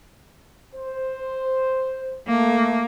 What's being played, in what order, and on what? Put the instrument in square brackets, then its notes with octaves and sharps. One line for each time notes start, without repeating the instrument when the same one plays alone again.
[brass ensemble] C5
[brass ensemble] A3 [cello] A#3